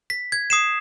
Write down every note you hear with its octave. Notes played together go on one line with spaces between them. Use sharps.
B6
G#6
D#6 C7 E7